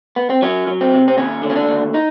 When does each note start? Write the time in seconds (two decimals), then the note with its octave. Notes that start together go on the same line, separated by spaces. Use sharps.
0.16 B3
0.30 C4
0.42 F#3 C#4
0.67 F#3
0.81 C4
0.94 C3
1.08 C4
1.18 D#2 C#4
1.43 D3
1.50 C#4
1.56 D4
1.69 D#2
1.94 D#4